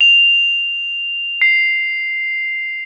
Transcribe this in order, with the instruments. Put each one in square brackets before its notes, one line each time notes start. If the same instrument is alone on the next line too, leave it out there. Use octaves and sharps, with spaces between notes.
[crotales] F7
C7